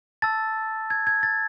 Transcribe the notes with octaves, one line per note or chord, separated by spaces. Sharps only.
A5 E6 A6
G#6
G#6
A6